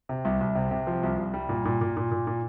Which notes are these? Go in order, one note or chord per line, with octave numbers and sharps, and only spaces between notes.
C3
C2
C2
C3
C3
F3
C2
C2
G3
A#2
A#2
A#2
A#2
A#2
A#2